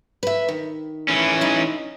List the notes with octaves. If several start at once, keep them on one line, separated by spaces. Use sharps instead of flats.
B4 E5
D#3
E3 C#4
D#4 E4